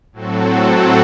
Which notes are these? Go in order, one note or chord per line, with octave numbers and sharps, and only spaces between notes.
A2 F#3 C4 F#4 A4